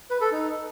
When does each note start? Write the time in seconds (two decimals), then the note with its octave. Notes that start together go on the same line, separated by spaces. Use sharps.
0.10 B4
0.21 A4
0.32 D#4